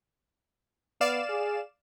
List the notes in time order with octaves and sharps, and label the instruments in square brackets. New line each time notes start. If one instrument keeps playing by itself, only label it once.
[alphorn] B3 [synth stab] D5 F5 E7
[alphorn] G#4